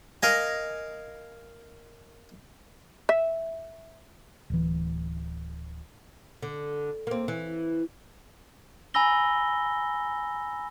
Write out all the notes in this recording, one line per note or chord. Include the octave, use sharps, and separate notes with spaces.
A#4 D#5 F5 G#5
E5
D1 E3
D3
A#3 C4
E3
G#5 A#5 B5 E6 A#6 G7